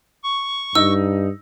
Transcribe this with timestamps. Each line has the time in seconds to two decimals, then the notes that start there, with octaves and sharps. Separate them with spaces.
0.23 C#6
0.75 G2 D#4 E6